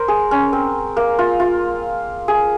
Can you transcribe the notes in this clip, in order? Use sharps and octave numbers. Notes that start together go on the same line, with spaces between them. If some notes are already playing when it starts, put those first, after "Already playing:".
Already playing: A#4 C5
G#4
C#4
C4
A#3
F4
F4
G#4